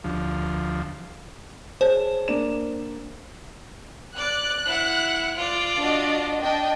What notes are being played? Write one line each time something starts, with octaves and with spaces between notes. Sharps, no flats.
D2 F3
G#4 C5 C#5 A5
A#3 D4 E7
D5 F#6
E4 F#5
F4 D5
D4 F#4 D#5
D4 D#5 G5